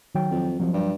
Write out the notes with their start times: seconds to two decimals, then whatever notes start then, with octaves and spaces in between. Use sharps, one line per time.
0.15 D#3 F#3 G5
0.31 F2
0.60 C2 F3 F#3
0.73 G2